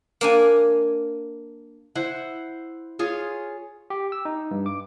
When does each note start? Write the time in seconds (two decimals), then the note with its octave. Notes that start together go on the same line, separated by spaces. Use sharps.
0.21 A#3 D4 G#5
1.95 E4 C5 F#5
2.99 F4 G#4 C#5
3.90 G4
4.12 E6
4.25 D#4
4.51 G2
4.66 D6